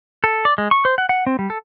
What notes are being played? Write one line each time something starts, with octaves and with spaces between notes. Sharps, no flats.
A4
D5
G#3
C#6
C5
F#5
F#5
C4
G3
A4